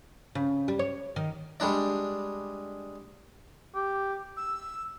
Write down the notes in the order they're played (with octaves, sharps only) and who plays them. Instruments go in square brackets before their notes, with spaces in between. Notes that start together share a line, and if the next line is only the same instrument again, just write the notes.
[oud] C#3
G3
C#5
D#3
[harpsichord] G3 G#3 D4 D5
[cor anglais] G4
[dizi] E6